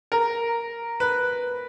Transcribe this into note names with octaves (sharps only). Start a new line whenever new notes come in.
A#4
B4